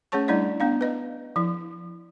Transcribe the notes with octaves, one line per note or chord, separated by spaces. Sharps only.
A3 C#4 G#4 C#5 A5 C#6
G3 A3 D4 E4 D5 D#5
B3 D4 F5
B4 D#5
F3 E4